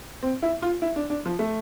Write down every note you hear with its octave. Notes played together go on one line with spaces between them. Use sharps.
C4
E4
F4
E4
D4
D4
F3
A3